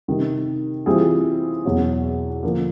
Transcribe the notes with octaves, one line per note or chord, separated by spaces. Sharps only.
C3 D#3 G3
E3 G3 C4 F4 G#4
E2 B2 F#3
D3 F3 A#3